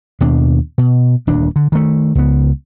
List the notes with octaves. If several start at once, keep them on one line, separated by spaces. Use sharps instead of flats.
D#2 B2 D4
B2
D#1 D2 D4
D3
D#3 A3
C#2 B3